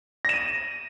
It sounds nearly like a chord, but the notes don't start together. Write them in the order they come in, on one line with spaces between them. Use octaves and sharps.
A#6 E7 D#7